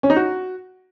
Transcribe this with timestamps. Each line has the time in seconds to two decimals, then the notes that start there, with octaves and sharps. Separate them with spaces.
0.03 C#4
0.10 D#4
0.16 F#4